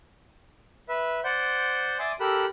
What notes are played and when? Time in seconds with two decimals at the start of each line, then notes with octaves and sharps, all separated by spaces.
0.89 B4 E5
1.24 C5 D5 F#5 G6
1.99 D5 E5 G#5 C6 D6 D#6
2.20 G4 A4 A#4 B5 E6 F#6